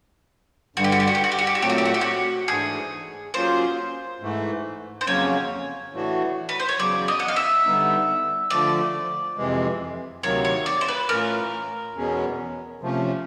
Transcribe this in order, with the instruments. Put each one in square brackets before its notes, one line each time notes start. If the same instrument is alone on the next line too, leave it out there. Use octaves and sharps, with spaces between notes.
[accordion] G2 D3 G3 [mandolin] F#4
[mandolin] G4
F#4
G4
F#4
G4
F#4
G4
F#4
G4
F#4
[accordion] A#2 F#3 A3 C4 [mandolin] G4
[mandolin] F#4
G4
F#4
G4
F#4
[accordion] G#2 E3 A3 D4 [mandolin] G#4
[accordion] F#3 A#3 C#4 F4 G#4 [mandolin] C5
[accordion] G#2 E3 A3
[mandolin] C5
[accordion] F2 C#3 F#3 A#3 C#4 [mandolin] C#5
[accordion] A2 E3 A3 D4 F#4
[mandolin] B4
C5
C#5
[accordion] E2 C#3 F#3 [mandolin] D5
[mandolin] D#5
F#5
F5
E5
[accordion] D3 G3 B3 D#4
[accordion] D3 F3 A3 [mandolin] D5
[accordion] F2 C3 E3 G#3
[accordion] D2 C3 D#3 F#3 A#3 [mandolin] C#5
[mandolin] C#5
D5
C5
B4
[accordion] A2 E3 A3 C#4 F4 [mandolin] A#4
[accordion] E2 B2 G#3 C#4
C3 F3 A3 C#4